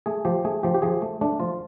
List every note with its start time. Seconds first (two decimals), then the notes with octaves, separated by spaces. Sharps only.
0.06 A3 G#4
0.25 F3 G4
0.45 A3 G#4
0.63 F3 G4
0.74 G4
0.82 F3 G#4
1.02 A3
1.21 A3 D4
1.40 F3 F4